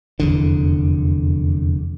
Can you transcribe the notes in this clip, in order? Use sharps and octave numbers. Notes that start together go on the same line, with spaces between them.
F1 E2 D3